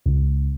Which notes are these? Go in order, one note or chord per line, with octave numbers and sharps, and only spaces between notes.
C#2